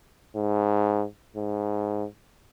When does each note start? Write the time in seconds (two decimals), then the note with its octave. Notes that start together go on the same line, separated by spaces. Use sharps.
0.36 G#2
1.36 G#2